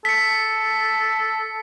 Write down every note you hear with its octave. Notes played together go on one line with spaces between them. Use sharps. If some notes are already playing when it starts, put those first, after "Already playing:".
A4 B6 C#7